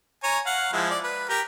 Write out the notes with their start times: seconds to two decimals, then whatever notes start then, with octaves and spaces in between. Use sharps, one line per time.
0.24 C#5 G#5 A#5
0.46 F5 F#5
0.73 F3 G#3 E4
0.90 D5
1.04 B4
1.29 G4 A#4 G5